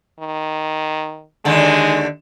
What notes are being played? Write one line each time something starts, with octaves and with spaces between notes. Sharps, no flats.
D#3
D#2 D3 G#3